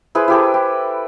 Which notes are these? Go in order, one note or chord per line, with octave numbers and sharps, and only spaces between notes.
E4 G#4 B4 C5
E4 G4 A4
G4